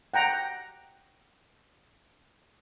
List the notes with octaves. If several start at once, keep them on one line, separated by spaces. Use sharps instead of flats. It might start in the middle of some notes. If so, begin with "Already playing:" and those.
F#5 G5 A#5